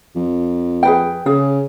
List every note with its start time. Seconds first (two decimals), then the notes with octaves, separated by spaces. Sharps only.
0.16 F2
0.83 G#4 B4 G5
1.26 C#3 G#4